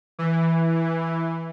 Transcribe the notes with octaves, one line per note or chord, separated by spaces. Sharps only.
E3